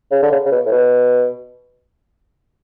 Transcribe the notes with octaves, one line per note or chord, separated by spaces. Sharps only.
C#3
D3
C#3
C#3
B2
A2
B2